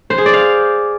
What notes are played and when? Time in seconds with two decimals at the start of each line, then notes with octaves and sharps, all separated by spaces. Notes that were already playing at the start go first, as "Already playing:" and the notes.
0.10 C5
0.18 G#4
0.26 D5
0.33 F5